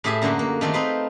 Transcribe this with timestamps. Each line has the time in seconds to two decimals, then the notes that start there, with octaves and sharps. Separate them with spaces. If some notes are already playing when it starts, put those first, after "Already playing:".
0.04 A2 G4 G#4 E5 G#5 A5
0.22 F#2 D3 A#3 F#4 C6
0.39 A#3
0.61 D#3 A3 C4 F4 D5
0.73 C4 D#4 B4 C5